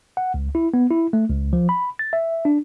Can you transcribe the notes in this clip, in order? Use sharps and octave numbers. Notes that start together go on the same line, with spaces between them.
F#5
C#2
E4
B3
E4
A3
C#2
F3
B5
A6
E5
D4